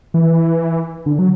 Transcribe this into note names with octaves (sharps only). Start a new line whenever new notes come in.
E3
D3
F#3